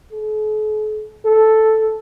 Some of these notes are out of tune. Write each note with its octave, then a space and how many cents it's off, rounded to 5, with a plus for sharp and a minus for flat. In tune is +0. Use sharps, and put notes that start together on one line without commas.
A4 -45
A4 +0